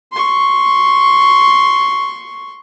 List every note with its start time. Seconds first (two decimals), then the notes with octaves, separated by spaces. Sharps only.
0.12 C6 C#6